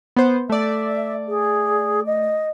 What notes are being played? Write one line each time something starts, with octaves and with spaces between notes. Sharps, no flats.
B3 C5
A3 D5 E5
G#4
D#5